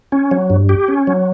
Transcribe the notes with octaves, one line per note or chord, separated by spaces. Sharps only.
C#4
F#3
G2
G4
C#4
F#3